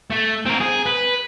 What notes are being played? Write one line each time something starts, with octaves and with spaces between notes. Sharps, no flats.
A3
C4 A#4
G#4
B4